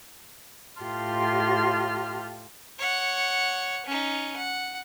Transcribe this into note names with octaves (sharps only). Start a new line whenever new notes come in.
A2 F4 G4 A5 C6 F6
C#5 F#5
C#4 D#4
F#5